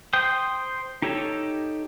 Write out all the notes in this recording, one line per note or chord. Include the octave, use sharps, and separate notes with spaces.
C5 G5 D#6
D#4 G4 A4 C#5